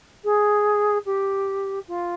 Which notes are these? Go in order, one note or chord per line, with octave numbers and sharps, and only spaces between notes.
G#4
G4
F4